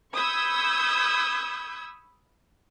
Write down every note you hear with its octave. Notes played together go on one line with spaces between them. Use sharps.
B5 C#6 D#6 E6 G6 G#6